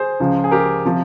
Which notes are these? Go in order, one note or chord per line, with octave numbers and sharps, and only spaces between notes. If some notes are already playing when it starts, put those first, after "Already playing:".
Already playing: G#4 C5
C#2 C#3 F3
G#4
G4 A#4
C3 F3